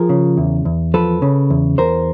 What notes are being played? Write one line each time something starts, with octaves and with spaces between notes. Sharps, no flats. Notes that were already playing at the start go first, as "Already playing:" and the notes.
Already playing: F3 G#4 A#4
C#3
E2
E2
F3 A4 B4
C#3
E2
E2 A#4 C5